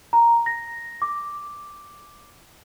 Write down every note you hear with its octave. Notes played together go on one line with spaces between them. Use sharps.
A#5
A#6
D6